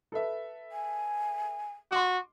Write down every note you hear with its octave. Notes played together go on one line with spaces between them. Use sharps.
A4 B4 E5
G#5
F#4 C6 D6